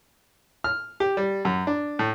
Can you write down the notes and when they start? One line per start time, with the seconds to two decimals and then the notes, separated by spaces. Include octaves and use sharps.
0.64 F6
1.00 G4
1.17 G3
1.45 F#2
1.67 D4
1.99 A2